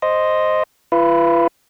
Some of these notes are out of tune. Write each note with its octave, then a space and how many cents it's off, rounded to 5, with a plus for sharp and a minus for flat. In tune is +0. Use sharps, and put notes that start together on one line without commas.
C5 +0 D#5 +0
F4 -45 B4 +0